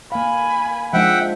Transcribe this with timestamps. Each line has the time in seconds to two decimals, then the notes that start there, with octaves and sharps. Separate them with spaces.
0.12 A#3 F5 G#5 B5
0.93 F3 G#3 D4 E5 F#5 G5